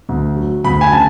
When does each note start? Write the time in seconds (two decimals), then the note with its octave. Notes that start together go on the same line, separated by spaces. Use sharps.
0.09 D2
0.36 F#3
0.64 D2 B5
0.81 G#5
0.92 C#3 A5